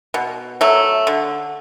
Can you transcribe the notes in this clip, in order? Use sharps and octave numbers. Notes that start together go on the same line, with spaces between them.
B2
F#3 A3
D3